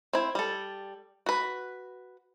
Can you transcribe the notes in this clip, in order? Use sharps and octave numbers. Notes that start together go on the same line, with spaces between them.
C4 E4
G3 A4
F#4 B4